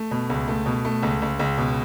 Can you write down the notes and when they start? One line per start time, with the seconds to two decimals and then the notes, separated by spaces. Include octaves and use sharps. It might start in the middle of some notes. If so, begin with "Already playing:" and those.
Already playing: A3
0.11 B2
0.30 C#2
0.48 A3
0.66 B2
0.85 A3
1.03 C#2
1.22 C#2
1.39 C#2
1.58 B2